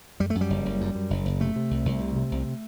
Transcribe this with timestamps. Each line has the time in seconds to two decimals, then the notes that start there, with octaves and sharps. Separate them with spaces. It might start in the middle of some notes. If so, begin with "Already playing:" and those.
0.20 F#2 G3
0.30 A3
0.35 F#2
0.41 G3
0.50 F#1
0.65 F#1
0.81 F#2
0.95 F#2
1.10 F#1
1.25 F#1
1.40 C3 A3
1.56 C3
1.71 C2
1.85 C2
2.00 C3
2.16 C3
2.31 C2